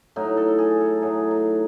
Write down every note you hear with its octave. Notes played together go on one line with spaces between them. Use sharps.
A2 F#3 D#4
A4
G#4
A4
A2 F#3 G#4
D#4